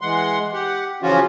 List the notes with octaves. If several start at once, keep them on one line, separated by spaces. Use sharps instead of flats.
E3 G#3 F#5 C6
G4 F#5
C#3 E3 F3 C#4 F4 F#4